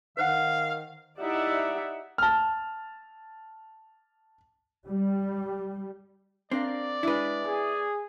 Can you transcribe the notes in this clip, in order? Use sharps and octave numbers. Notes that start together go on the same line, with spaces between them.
D#3 B4 C5 F5 F#5
D#4 E4 G4 D5 E5 F#5
A5 F6
G3
C4 D4 A#4 D5 F5
G#3 D4 E4 B4
B3 G#4